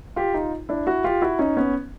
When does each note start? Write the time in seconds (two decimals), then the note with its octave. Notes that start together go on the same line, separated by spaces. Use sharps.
0.16 F4 G4
0.34 D#4 F4
0.69 D4 E4
0.87 E4 F#4
1.04 F4 G4
1.22 E4 F#4
1.39 C#4 D#4
1.57 B3 C#4